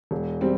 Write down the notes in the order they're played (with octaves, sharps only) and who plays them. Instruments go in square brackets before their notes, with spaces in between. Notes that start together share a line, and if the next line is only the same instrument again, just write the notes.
[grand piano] E1
G3 C4